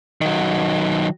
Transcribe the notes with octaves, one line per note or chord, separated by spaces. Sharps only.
D#3 F#3